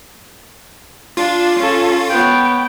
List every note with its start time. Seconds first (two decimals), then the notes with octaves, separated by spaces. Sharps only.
1.17 D4 F4
1.59 C#4 A4
2.09 B3 C#5 G5